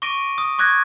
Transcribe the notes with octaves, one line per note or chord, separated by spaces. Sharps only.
C#6 D6 A#6 D7 D#7
D#6
C#6 D6 F#6 G#6 A#6